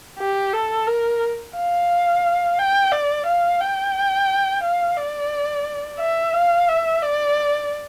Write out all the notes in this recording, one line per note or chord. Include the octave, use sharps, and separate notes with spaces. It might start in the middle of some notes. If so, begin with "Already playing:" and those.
G4
A4
A#4
F5
G5
D5
F5
G5
F5
D5
E5
F5
E5
D5